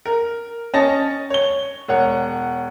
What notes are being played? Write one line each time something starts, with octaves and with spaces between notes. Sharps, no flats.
A#4
C#4 C#5 D#5 A5 A6 A#6
C#5 G7
E1 C#5 F#5